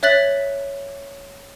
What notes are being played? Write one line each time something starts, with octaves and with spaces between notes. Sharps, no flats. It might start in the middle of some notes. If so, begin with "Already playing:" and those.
C#5 E5 F#6 A6 B6 F#7